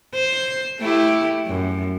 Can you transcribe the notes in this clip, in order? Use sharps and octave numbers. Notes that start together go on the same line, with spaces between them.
C5
A3 E4 G4
F#2